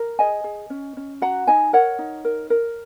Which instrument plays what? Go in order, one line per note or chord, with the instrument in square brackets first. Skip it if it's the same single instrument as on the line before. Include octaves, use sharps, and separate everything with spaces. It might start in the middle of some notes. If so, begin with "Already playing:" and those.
Already playing: [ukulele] A#4
G#4 D#5 G#5
G#4
C#4
C#4
F#4 F#5 A#5
D#4 D#5 G#5
A#4 C#5 F#5
D#4
A#4
A#4